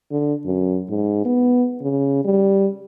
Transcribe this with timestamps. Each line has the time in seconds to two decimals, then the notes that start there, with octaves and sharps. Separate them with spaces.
0.11 D3
0.45 F#2
0.89 G#2
1.25 B3
1.81 C#3
2.25 G3